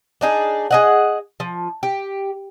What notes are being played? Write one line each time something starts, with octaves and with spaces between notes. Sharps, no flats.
D4 D#4 G#4
G#4 D#5 F#5
F3
G4